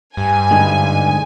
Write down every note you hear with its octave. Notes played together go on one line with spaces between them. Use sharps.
G2 G#5
G#2 D3 G#3